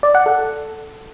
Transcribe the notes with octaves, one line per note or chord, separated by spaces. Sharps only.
D5
F#5
A4